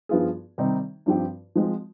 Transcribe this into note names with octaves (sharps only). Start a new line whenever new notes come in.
G2 F3 B3 F4 G#4
C3 D#3 G3 C4 D#4
G2 F3 C4 G4
F3 G#3 C4